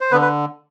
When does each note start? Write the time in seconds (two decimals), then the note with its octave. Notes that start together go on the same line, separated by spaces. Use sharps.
0.01 C5
0.11 D3 B3 B4
0.21 B4